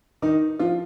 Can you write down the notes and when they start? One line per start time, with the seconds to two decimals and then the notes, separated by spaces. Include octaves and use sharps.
0.22 D#3 D#4
0.59 F3 F4